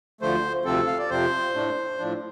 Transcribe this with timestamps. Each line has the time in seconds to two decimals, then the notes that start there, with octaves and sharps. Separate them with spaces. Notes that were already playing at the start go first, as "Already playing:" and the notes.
0.21 D2 D3 F3 A3 C5
0.65 D2 C3 F3 C4 A4
0.87 F5
0.99 D5
1.10 F2 C3 F3 C4 C5
1.54 A2 A3 D4
1.98 A2 F3 D4